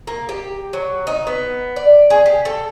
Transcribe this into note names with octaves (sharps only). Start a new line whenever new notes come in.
A#3
G4
F#3
D#4
B3
D5
G#4
G4
A4